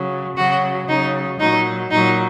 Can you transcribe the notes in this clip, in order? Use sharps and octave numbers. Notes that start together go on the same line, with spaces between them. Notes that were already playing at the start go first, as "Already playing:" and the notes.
Already playing: C#3 F#3
C#3 F#3 F#4
C#3 F#3 D#4
A#2 F#3 D#4
A#2 F#3 D#4